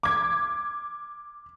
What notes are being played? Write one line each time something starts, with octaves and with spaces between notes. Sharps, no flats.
D6 G#6